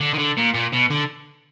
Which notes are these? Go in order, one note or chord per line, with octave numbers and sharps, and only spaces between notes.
D3
D#3
D3
A#2
A#2
B2
D3